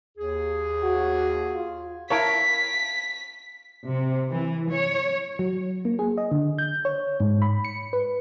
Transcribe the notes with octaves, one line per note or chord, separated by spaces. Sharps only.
D#2 G#4
F#4
F4
E4 A#4 C#5 F5 A5 B6 D7
C3
E3
C#5
F#3
A#3
G#4
D#5
D3
G6
C#5
G#2
B5
C#7
B4